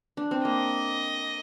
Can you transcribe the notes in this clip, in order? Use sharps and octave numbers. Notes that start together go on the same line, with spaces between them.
D4
C4
A#3 D#5